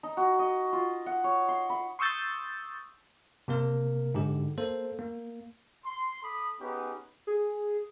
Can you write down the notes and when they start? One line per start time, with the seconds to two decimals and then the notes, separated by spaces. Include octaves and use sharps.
0.03 D#4
0.17 F#4
0.39 D#5
0.73 F4
1.06 F#5
1.24 C#5
1.48 C6
1.70 B5
1.99 C6 C#6 D#6 E6 G6 A6
3.48 C3 A#3 A#4
4.14 G#2 D3 G4
4.57 A#3 A4 C5
4.99 A#3
5.86 C6
6.23 A4 B5 D6 D#6
6.61 B3 C#4 D#4 G4 G#4 B4
7.27 G#4